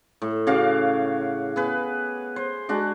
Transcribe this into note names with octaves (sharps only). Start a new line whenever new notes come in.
A2
C#3 F#4 F5 D6
B3 G#4 B4
C5
G#3 D4 F#4